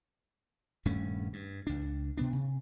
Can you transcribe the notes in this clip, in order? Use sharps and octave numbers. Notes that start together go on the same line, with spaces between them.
D#1 G2 A3 C#4
G2
C#2 D4
B2 B3 D4
C3